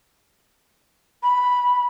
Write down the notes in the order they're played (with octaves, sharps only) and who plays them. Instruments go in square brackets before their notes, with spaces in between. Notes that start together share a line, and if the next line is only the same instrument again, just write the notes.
[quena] B5